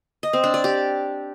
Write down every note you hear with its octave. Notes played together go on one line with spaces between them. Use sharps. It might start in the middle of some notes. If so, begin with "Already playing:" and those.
D#5
C4
D4
D5
G4